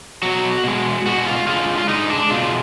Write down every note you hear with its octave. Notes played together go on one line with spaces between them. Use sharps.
B2 F#3 F#4
B2 G#3
B2 G#3 F#4
F4
D3 G#3 F4
F4
D3 G#3 D#4
D4
B2 G#3 F4